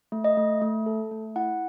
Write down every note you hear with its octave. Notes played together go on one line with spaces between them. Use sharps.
A3
D#5
A3
A3
A4
A3
E4 F#5